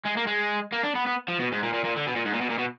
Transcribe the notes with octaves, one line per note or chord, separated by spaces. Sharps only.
G#3
A#3
G#3
A#3
D4
B3
B3
F3
B2
G#2
A#2
A#2
A#2
D3
B2
A#2
G#2
A#2
B2
A#2
B2